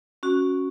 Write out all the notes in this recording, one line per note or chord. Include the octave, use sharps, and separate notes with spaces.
C#4 F#4